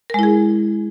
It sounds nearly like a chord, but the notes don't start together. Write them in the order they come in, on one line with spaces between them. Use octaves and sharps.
A#4 G#3 E4 G#4